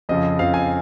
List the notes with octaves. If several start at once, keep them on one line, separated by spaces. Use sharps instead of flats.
F2 C#3 F3 D#5
F2 C#3 F3 F5
G#5